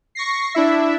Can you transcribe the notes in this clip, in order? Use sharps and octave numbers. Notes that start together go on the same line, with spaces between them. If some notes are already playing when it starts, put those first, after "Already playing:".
C#6 A#6 C7
D4 E4 E5